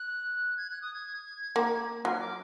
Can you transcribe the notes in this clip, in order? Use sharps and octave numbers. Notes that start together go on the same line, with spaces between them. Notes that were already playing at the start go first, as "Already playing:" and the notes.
Already playing: F#6
G#6
F#6
D#6
G#6
A#3
F#3 F6
D6